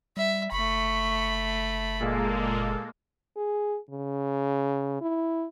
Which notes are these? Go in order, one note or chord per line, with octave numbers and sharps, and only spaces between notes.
G3 E5
F#1 A3 B5 C#6
A#2 G#3 A#3 A4
G#4
C#3
E4